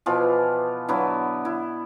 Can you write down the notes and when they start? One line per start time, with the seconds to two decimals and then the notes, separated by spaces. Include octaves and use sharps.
0.06 B2 E3 F3 F4
0.89 D3 F#3 B3 E4
1.45 E4